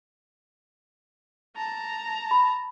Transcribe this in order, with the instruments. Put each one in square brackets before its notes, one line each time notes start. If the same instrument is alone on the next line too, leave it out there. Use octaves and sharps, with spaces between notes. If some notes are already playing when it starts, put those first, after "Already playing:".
[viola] A5 A#5
[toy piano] B5